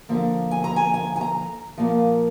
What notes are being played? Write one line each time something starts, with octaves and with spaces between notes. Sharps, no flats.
D3 F3 A#3
G#5
A#5
G#5
G#5
G#5
A#5
A#2 F3 A#3